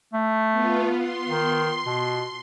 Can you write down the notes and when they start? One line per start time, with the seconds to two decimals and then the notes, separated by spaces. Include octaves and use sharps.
0.13 A3
0.52 B3 F4
0.97 C6
1.28 D#3
1.86 B2